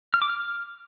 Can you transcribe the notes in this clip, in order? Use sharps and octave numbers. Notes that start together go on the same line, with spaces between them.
F6
D6
F6